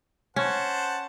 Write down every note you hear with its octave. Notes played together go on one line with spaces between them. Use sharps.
C#4 C5 F#5 A5